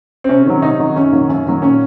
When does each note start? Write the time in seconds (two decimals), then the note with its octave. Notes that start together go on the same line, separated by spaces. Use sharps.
0.24 C4
0.29 C3 C#4
0.46 D#3 F#3
0.62 C3 D#4
0.79 D#3 F#3
0.96 F#2 C#4
1.12 D#3 F#3 A#3
1.29 F#2
1.46 D#3 F#3 A#3
1.62 A#2 C#4